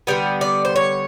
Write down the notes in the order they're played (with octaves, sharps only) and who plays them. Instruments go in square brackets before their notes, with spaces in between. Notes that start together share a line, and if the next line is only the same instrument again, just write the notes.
[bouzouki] D3 G3 B3 D5
D5
C5
C#5